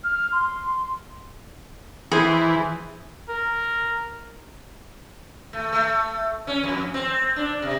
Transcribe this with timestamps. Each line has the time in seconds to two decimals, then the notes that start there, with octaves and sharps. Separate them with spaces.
0.04 F6
0.32 C6
2.12 E3 G#4 C5
3.29 A#4
5.53 A3
5.72 A3
6.47 C#4
6.64 F2
6.94 C4
7.36 D4
7.62 C3